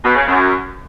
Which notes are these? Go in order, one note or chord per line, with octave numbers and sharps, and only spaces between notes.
B2
C#3
F#2